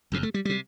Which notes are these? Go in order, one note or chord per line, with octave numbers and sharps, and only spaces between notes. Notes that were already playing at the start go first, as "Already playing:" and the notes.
F#1 E2 C3
A3
G3
C3 G3